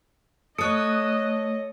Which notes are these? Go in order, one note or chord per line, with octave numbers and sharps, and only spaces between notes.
A3 A4 C#5 D#5 D#6 F#6